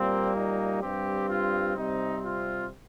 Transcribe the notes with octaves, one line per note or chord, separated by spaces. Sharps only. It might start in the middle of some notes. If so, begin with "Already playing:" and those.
Already playing: A#2 G3 A#3 C4
D#4
G2 G3 C4 G4
F4
C3 G3 C4 D#4
F4